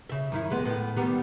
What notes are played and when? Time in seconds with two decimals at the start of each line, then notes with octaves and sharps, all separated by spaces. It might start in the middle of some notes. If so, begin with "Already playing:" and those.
0.09 C#3 E5
0.32 F#2 D#3 E4
0.50 D#2 G#3 B3
0.65 A2 B3
0.96 D#3 G3 B3